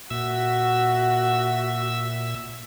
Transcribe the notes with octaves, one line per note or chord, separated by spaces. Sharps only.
A#2 F#4 E5 E6